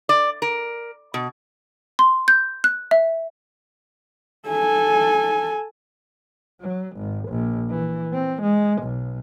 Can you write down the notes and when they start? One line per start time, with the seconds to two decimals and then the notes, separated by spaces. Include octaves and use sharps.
0.09 D5
0.42 A#4
1.14 B2
1.99 C6
2.28 G6
2.64 F#6
2.91 E5
4.49 A4 G#5
6.60 F#3
6.96 G#1
7.29 A#1
7.70 E3
8.13 C4
8.42 G#3
8.82 B1